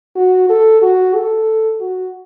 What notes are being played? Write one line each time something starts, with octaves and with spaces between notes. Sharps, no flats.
F#4
A4
F#4
A4
F#4